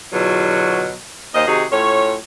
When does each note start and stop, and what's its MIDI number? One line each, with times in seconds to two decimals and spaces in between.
0.12 0.93 40
0.12 0.93 47
0.12 0.93 50
0.12 0.93 54
0.12 0.93 65
1.35 1.45 39
1.35 1.45 70
1.35 1.45 72
1.35 1.45 75
1.47 1.65 48
1.47 1.65 51
1.47 1.65 63
1.47 1.65 66
1.47 1.65 68
1.71 2.13 45
1.71 2.13 61
1.71 2.13 65
1.71 2.13 73